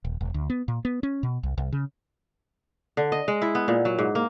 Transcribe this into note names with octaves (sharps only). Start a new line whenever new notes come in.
D#1
E1
D2
B3
A#2
B3
C#4
B2
C2
C2
C#3
D3
D#5
G#3
E4
B3
A#2
F#3
G#2
A#3